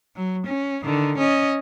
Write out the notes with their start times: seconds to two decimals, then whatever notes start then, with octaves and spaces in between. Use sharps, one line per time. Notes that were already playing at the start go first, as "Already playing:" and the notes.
0.16 F#3
0.47 C#4
0.84 D3 D#3
1.18 C#4 D#5